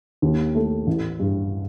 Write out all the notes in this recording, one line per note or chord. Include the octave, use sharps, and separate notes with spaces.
D#2
A3
A1
G2